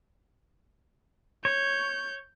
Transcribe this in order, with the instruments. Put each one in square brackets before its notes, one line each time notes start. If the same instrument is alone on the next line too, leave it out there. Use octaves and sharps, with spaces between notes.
[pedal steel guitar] C#5 [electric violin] G6